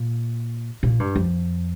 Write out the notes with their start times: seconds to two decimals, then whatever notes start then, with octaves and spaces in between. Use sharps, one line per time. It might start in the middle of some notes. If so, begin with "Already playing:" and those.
Already playing: A#2
0.83 A#2
1.00 G2
1.16 F2